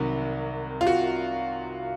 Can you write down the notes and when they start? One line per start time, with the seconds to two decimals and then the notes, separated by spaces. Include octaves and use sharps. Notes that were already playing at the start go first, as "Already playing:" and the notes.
Already playing: C2 C3 D#3 F#3
0.81 F4
0.87 F#4